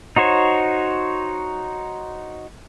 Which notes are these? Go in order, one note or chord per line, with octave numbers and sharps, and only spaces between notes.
D#4 F#4 C5 C#5